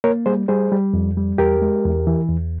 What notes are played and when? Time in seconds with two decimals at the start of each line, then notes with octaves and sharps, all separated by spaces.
0.04 A#3 A#4 C#5
0.26 G3 G#4 C5
0.48 G3 G#4 C5
0.72 G3
0.93 F2
1.17 G3
1.38 E2 G4 A#4
1.62 G#3
1.85 E2
2.07 E3
2.29 E2